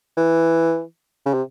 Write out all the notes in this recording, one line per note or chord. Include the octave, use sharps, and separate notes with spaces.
E3
C#3
C3